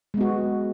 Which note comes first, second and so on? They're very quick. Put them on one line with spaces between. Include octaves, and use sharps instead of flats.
G#3 B3 F#4